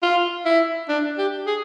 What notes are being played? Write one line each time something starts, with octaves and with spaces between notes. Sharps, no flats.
F4
E4
D4
G4
G#4